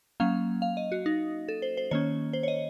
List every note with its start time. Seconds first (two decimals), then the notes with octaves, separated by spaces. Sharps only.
0.20 F#3 A#3 C#4 F5
0.62 F5
0.77 D#5
0.92 F#4
1.06 D#4
1.48 A4
1.62 C5
1.77 C5
1.91 D#3 A#3 C#4 C#5
2.33 C5
2.43 C#5
2.48 D#5